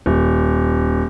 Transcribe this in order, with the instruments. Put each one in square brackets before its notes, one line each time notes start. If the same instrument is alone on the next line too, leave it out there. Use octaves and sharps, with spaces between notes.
[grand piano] D#1